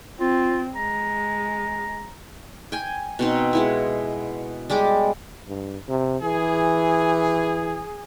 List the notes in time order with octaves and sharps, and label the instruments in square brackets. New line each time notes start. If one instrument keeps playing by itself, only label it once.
[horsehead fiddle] C4 [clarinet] F4
[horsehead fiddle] G#3 [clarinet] A#5
[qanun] G5 G#5
B2 C4 D#4
G#3 B3 E4
G3 G#3 G4 D6
[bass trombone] G2
C3
[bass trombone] E3 [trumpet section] G#4